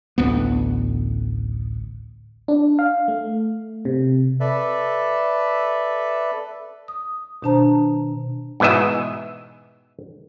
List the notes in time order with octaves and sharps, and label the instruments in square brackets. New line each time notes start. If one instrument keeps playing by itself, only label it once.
[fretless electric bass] A1 D2 B3
[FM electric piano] D4
F5
A3
C3
[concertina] A4 B4 D5 E5
[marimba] D#6
B2 D#3 D4 C5 A5 A#5
[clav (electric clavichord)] G#2 B2 E3 D#5 E5